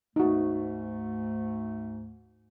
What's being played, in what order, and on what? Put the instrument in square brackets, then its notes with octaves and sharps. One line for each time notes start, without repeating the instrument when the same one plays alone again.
[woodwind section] D2 G#2 A3 [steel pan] D#4 F#4